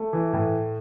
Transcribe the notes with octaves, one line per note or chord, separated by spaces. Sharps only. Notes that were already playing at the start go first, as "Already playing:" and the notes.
Already playing: A3
E3
A2